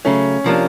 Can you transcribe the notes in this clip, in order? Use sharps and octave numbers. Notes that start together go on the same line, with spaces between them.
C#3 F#3 A3 C#4
C3 F3 A#3 D4 F4